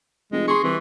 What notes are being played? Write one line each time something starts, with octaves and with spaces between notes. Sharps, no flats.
F1 G#3
G#4 C6 C#6
C2 E3